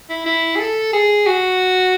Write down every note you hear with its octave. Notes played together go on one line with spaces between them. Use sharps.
E4
E4
G#4
A4
G#4
F#4